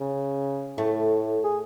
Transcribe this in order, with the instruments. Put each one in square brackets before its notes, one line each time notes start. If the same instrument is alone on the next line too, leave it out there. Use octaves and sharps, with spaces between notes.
[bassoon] C#3
[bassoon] A2 [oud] A3
[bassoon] G#4